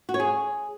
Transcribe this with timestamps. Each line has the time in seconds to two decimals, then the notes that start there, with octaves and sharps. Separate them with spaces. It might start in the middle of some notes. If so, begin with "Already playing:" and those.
0.09 F#4
0.14 C#5
0.20 G#4